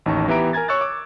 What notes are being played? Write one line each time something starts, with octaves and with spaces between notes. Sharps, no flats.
A1 D#2 D#4 A5 C#6
E3 B3 G4 E5 A#5 D7
A#4 G#5 A#5 G#6 A6
C#5 C#6 E6 F#6 A6
D6